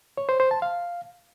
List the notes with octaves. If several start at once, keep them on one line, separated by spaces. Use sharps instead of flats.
C#5
C5
C5
A5
F5